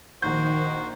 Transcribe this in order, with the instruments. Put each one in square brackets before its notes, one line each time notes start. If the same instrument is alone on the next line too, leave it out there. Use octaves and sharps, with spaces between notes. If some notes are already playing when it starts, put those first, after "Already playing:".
[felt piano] A#1 D#4 G6 [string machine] D#3 [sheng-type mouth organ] F#4 C5